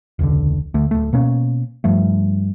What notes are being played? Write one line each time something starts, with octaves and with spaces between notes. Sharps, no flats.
E1 C#2 D3
D2 A3
D1 A3
B2 A#3 C#4
G2 F3 A3